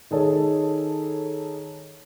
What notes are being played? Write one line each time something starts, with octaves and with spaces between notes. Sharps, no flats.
D#3 G#4 A4 C#5